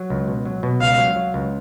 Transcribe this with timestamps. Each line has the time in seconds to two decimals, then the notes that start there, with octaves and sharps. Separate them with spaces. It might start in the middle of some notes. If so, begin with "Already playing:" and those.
Already playing: F#3
0.10 C#2
0.28 B2
0.45 F#3
0.63 B2
0.81 C#2 F5
0.98 F#3
1.16 F#3
1.34 C#2